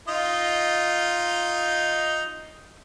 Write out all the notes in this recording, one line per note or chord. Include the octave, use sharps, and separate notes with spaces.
D#4 F4 D#5